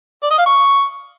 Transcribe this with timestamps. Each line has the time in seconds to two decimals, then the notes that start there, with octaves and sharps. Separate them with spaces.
0.23 D5
0.31 D#5
0.38 F5
0.46 C#6